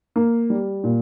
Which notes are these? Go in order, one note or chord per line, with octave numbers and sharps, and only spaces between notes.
A#3
G3
A#2